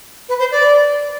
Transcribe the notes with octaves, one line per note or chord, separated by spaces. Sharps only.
B4
C5
D5